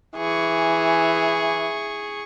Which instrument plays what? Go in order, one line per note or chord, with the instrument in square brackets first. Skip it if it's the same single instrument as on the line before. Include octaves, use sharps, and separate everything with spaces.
[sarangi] E3 [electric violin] G#4 C#6